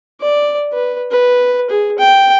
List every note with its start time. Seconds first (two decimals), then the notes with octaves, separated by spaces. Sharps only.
0.21 D5
0.73 B4
1.11 B4
1.70 G#4
1.98 G5